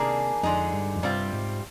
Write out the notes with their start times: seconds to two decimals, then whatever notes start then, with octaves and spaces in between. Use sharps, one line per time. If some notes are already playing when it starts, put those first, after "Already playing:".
Already playing: C3 D#3 A#3 D4 G#4
0.43 F2 D3 G#3 D#4
0.73 G2
0.95 F2
1.03 G2 C3 G3 C4 F4
1.33 G#2